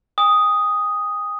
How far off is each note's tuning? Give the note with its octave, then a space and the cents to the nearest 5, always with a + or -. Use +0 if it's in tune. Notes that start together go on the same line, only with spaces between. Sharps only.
G#5 -45 D#6 +0